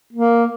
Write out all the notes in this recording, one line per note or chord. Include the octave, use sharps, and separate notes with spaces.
A#3